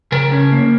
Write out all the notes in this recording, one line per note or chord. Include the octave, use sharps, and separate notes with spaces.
C#3 A#4
C#4
A#3